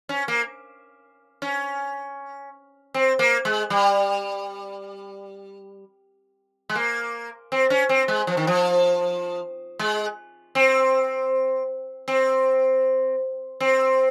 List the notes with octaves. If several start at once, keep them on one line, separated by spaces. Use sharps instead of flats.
C#4
A#3
C#4
C4
A#3
G#3
G3
G#3
A#3
C4
C#4
C4
G#3
F3
D#3
F3
G#3
C4
C4
C4